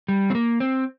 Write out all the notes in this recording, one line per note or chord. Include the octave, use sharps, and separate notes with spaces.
G3
C4
A#3
C4